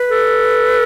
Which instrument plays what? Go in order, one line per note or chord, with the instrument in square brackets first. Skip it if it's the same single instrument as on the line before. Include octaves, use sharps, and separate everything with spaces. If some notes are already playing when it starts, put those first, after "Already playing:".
Already playing: [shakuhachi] B4
[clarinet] A4